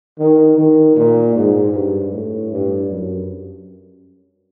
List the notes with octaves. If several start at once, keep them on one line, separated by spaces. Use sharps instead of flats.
D#3
D#3
A#2
G#2
G2
A2
G2
F#2